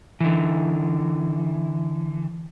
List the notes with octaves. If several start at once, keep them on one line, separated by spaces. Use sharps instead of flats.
D3 E3